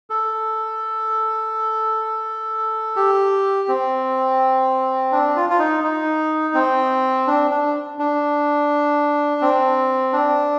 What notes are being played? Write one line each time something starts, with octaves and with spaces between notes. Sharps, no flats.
A4
G4
C4
D4
F4
F4
D#4
D#4
C4
D4
D4
D4
C4
D4